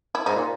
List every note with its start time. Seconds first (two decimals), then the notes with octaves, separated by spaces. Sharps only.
0.15 E4
0.26 G#2 D#4
0.36 A#2